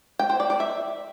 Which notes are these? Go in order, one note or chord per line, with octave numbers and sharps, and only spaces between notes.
G5
C5
D5
D5
E5